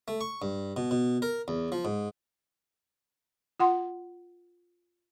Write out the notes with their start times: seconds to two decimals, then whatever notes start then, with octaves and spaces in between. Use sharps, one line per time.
0.08 A3
0.21 C#6
0.42 G2
0.77 B2
0.91 B2
1.22 A#4
1.48 E2
1.72 F3
1.85 G#2
3.60 F4 F#5 C6